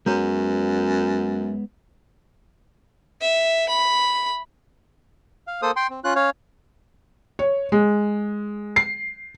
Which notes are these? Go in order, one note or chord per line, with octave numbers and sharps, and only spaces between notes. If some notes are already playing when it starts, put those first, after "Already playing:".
F#2 G#3 B3 C#5
E5
B5
F5
A#3 A4 C5 D#6
G5 C6
C4
C#4 F4 F#6
C#4 C#5 F5
C#5
G#3
C7